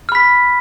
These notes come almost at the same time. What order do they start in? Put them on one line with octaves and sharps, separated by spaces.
F6 B5 B6